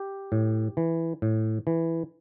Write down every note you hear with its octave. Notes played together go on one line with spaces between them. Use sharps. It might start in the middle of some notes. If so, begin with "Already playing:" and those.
Already playing: G4
A2
E3
A2
E3